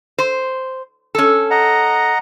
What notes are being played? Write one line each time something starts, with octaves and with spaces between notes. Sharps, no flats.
C5
C#4 A4
D#5 F#5 A#5